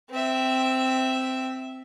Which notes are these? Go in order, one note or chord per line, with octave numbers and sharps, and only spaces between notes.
C4 E5